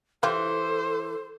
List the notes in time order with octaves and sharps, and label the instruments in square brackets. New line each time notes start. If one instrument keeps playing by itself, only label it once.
[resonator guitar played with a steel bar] E3 [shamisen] E4 F4 G4 [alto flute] A4 [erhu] C5